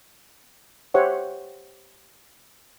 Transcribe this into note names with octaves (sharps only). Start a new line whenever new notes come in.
G4 C5 C#5 E5 F#5